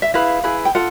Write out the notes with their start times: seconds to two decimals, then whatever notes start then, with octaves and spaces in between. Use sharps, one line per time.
0.02 E5
0.14 E4 G#4 B4 F5
0.44 E4 G#4 B4
0.65 G5
0.75 F4 A4 F#5